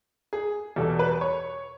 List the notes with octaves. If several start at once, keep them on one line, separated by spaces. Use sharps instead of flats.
G#4
E2 B2 G3 A4
B4
C#5